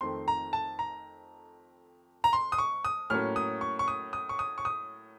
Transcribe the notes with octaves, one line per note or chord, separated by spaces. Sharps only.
F2 D#3 A3 C4 C6
A#5
A5
A#5
A#5
C6
D#6
C#6
D#6
A2 F#3 A#3 C#4 F6
D#6
C#6
C#6
D#6
D#6
C#6
D#6
C#6
D#6